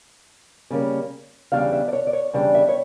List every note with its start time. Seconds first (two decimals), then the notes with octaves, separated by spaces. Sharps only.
0.70 C#3 G3 A#3 C#4
1.52 E2 C#3 G3 D4 F5
1.72 E5
1.88 D5
1.93 C#5
2.07 D5
2.13 C#5
2.33 E2 C#3 G3 D4
2.55 E5
2.69 C#5